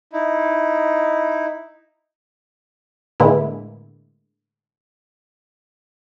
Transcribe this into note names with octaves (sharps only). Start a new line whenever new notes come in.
D#4 E4
A2 D3 G#3 A#3 B3 E4